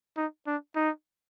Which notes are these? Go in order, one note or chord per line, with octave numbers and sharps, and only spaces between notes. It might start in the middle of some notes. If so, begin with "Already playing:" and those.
D#4
D4
D#4